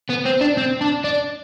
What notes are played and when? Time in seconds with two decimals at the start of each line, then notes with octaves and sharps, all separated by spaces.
0.10 B3
0.26 C4
0.41 D4
0.57 C4
0.81 D4
1.04 D4